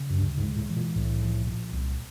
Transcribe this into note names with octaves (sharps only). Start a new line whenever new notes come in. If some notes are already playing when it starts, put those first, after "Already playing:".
Already playing: C#3
F#2
D2 G2
G#2
G#3
A2
E3
A#2
C2 A2
F3
A#2
C2